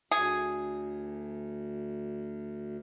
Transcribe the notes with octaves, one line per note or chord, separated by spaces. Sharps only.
D2 G#4